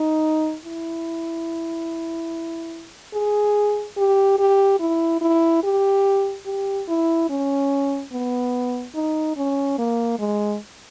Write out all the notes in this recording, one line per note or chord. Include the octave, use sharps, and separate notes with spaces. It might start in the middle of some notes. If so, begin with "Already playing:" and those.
Already playing: D#4
E4
G#4
G4
G4
E4
E4
G4
G4
E4
C#4
B3
D#4
C#4
A#3
G#3